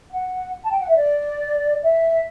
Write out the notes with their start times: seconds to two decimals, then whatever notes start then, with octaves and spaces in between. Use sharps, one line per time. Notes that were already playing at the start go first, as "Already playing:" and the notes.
0.11 F#5
0.63 A5
0.70 G5
0.79 F#5
0.88 E5
0.96 D5
1.82 E5